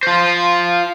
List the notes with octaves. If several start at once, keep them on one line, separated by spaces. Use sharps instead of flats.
F4 C5